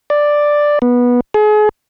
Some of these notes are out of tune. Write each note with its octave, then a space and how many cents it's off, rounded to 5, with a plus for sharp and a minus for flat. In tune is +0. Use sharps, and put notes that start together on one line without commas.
D5 +5
B3 -15
G#4 +35